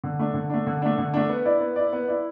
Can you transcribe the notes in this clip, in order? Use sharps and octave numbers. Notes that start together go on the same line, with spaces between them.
D3
A3 D4
D3
A3 D4
D3
A3 D4
D3
A3 D4
B3
E4 D5
B3
E4 D5
B3
E4 D5